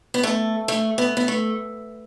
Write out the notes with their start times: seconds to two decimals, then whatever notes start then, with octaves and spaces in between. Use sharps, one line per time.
0.14 B3
0.23 A3
0.68 A3
0.98 B3
1.17 B3
1.28 A3